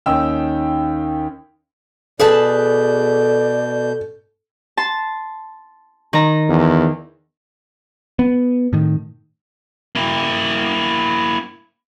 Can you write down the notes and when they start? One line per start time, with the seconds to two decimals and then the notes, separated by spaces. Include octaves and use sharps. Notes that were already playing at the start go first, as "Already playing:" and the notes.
0.06 D#2 C#4 D#4 G5 E6
2.20 B2 G#4 A4 B4 D5 A5 G6
4.77 A5 C6
6.13 D#3 A#5
6.49 E2
8.19 B3
8.73 A2 D#3
9.95 A#3 E4